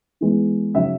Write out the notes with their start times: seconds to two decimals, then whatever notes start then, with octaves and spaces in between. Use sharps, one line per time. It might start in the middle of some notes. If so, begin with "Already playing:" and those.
0.21 E3 G#3 B3
0.74 C#3 F#3 C#4 E5